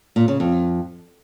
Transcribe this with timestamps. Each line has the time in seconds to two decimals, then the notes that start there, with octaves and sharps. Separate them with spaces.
0.16 A#2
0.28 C#3
0.40 F2